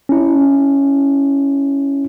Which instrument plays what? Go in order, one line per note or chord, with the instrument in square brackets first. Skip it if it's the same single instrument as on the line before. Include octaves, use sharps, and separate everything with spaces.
[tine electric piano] C#4 E4